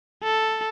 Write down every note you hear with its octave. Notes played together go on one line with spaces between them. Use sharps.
A4